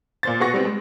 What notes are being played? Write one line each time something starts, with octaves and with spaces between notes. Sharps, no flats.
A#2 C5 A6
B2 B3 G#4 F#5 C#6 A#6
G3 B3 C4
G#3